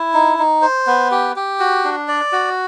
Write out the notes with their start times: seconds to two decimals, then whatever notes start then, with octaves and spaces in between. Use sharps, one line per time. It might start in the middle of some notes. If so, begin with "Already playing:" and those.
Already playing: E4
0.14 D#4
0.38 D#4
0.62 C5
0.87 B3
1.11 G4
1.36 G4
1.60 F#4
1.84 D4
2.08 D5
2.32 F#4